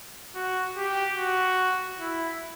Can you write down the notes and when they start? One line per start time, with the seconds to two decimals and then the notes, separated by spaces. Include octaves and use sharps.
0.35 F#4
0.76 G4
1.17 F#4
2.00 E4